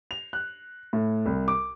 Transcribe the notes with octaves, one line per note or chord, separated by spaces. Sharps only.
F7
F#6
A2
C2
D6